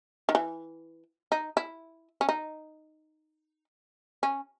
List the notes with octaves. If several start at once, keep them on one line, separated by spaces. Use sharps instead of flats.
D#3
E3
D#4
E4
C#4
D#4
C#4